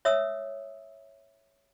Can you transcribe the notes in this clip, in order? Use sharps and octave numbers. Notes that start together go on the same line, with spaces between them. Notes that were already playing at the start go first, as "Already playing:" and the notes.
C#5 E5 D#6 E6